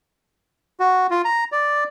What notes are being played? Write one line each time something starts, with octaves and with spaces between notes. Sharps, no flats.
F#4
F4
A#5
D5